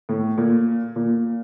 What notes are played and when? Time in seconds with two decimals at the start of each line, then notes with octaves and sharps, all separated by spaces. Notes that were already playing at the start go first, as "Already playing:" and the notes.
0.09 A2
0.38 A#2
0.96 A#2